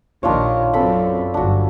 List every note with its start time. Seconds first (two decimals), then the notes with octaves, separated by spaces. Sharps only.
0.23 A#1 D#2 D#3 D4 F4 C#5
0.73 F#2 C4 A4 B5
1.34 G1 D4 F#4